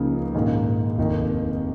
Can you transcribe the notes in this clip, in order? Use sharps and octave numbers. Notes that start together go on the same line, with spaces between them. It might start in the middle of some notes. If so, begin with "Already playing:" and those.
Already playing: C#2 C#3 F3 A#3 D#4
A#1 G#2 D#3 A#3
F1 D#2 D#3